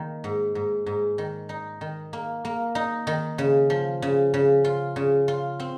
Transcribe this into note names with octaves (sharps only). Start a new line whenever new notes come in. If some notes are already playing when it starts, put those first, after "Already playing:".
Already playing: D#3 A#3
G#2
G#2
G#2
D#3
D#4
D#3
A#3
A#3
D#4
D#3
C#3
F3
C#3
C#3
F4
C#3
F4
C4